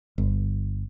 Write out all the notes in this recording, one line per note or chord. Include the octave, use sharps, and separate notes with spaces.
G1